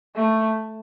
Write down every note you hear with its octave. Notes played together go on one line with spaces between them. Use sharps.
A3